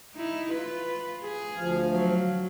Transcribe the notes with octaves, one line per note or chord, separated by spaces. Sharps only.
D#4 E4
F4 B4
G#4
D2 F3 F5
F#3